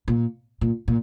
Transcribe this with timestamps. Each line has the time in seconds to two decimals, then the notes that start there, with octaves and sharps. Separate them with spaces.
0.08 A#2
0.61 A#2
0.88 A#2